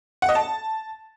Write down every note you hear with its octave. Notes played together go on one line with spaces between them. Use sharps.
F#5
D#5
A5